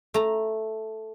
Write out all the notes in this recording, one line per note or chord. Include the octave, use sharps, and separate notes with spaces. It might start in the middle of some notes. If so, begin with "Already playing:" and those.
A3 A#5